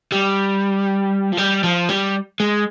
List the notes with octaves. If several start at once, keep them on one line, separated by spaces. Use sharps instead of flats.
G3
F3
G3
F3
G3
G#3